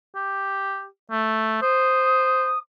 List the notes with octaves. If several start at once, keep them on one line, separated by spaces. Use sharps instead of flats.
G4
A3
C5 D#6